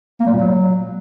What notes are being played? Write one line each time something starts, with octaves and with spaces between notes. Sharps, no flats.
A#3
G3
A#2
F#3